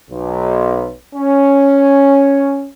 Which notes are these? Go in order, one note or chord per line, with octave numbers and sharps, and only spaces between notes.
B1
C#4